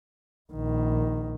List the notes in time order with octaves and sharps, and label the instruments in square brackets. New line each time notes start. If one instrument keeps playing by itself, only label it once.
[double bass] A#1 D#3